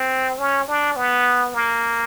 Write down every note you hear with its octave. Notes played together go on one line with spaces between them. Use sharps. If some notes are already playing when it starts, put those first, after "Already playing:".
Already playing: C4
C#4
D4
B3
A#3